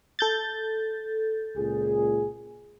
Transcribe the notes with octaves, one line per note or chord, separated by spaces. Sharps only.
A4 G6 A6
C#2 A#2 G#4